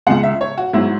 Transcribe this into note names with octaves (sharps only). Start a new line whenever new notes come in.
C#2 C#3 G#3 F#5
E5
C#5
F#4
G#2 F#3 E4